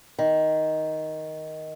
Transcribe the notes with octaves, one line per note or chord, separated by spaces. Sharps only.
D#3